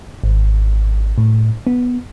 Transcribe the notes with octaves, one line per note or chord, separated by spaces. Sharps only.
G#1
A2
B3